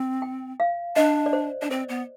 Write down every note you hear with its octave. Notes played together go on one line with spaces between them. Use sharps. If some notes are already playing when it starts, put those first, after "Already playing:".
Already playing: C4
G5
F5
D4 D#5
D5
C5
D4 D5
C4 C5
B3